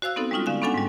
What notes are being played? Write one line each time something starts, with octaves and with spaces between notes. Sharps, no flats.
F#4 C5 F5 E6 F#6
B3 C4 D#4 A4
G3 G#3 C#4 D#4 F4
D3 F5 G#5
B3 C#4 D4 A4 F#5 G#5
G#2 G3